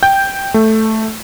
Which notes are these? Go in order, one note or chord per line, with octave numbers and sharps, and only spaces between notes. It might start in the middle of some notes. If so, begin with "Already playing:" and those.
G5 G6
A3